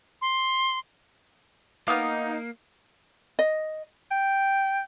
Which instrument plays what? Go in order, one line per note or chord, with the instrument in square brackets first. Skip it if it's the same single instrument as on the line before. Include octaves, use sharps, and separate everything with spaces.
[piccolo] C6
[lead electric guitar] A#3 [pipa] B3 F5 [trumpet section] D#4 [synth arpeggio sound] D6 D#6 F6
[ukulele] D#5
[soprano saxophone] G5